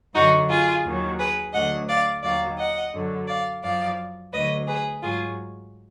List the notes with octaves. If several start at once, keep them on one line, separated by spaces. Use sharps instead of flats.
F#2 D3 F#3 D#4 F#4
F4 G#4
D#2 D#3 F#3
G#4 B4
D2 D3 F#3 D#5 F#5
D5 F5
D#2 D#3 F#3 D5 F5
D#5 F#5
F#2 D3 F#3
D5 F5
F#2 F3 D5 F5
D2 D3 F#3 B4 D#5
G#4 B4
G#2 F#3 F4 G#4